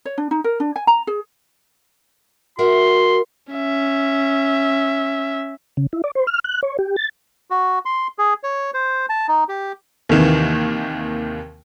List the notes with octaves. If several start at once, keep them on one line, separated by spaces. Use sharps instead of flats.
C#5
D4
D#4
A#4
D4
G#5
A#5
G#4
F#4 A#4 E5 F#5 C6
C#4 E5
C#3
E4
D5
C5
F6
F#6
C#5
G4
A6
F#4
C6
G#4
C#5
C5
A5
D#4
G4
D#2 C3 D#3 E3